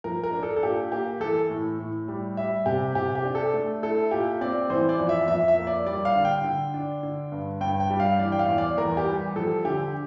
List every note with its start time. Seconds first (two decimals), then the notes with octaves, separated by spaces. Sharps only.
0.04 F3 A#4
0.24 A#4
0.33 D4
0.43 A4
0.56 A4
0.63 A#2 G4
0.92 A#3 G4
1.20 E3 A4
1.49 A2
1.78 A2
2.08 G3
2.37 G3 E5
2.66 C3 G4
2.95 C3 G4
3.15 G4
3.25 D4
3.35 A4
3.54 A3
3.83 E4 A4
4.11 A#2 G4
4.41 C4 D5
4.70 E3 C5
4.89 D5
4.99 F2
5.09 E5
5.28 F2 E5
5.48 E5
5.57 A#3
5.67 D5
5.86 G3 D5
6.05 F5
6.15 D3
6.25 G5
6.44 D3
6.74 D4
7.03 D3
7.32 G2
7.61 G2 G5
7.80 G5
7.90 G3
8.00 F5
8.19 E3 D5
8.32 G5
8.39 F5
8.49 E2
8.58 D5
8.77 E2 A#4
8.97 G4
9.06 G3
9.36 F3 A4
9.65 D3 G4